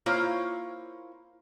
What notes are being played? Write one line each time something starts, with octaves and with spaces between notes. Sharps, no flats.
A#3 E4 F4 C5 C#5